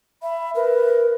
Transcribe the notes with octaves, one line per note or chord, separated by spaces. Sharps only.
E5 B5
A#4 B4